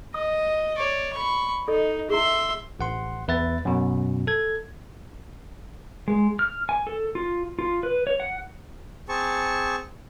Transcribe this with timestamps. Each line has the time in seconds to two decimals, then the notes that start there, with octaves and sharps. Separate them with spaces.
0.14 D#5 D#6
0.77 C#5 D5
1.13 B5 C#6
1.68 D#4 A4 D#5
2.10 E4 G#4 E5 C6
2.79 A1 F#5 C6
3.28 E2 B4 E5 A6
3.65 F#2 B2
4.27 A4 G#6
6.08 G#3
6.39 F6
6.69 G#5
6.87 A4
7.15 F4
7.59 F4
7.83 B4
8.07 C#5
8.20 F#5
9.09 C4 G#4 A5 C#6